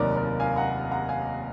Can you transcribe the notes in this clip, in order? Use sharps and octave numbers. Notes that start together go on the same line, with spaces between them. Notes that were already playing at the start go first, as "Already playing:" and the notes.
Already playing: F1 D#2 D#3 F#3 A#4 D5
A#4 D5
F5 G#5
F#5 A#5
F#5 A#5
F5 G#5